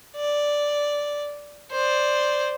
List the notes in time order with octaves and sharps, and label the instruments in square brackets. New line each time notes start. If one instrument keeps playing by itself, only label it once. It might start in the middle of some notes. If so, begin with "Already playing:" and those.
[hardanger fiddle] D5
C5 D5